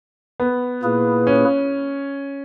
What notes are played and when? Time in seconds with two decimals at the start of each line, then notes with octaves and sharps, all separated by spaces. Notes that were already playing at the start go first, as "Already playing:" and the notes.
0.40 B3
0.83 A#2 A#3 E4 G#4 B4
1.27 C#4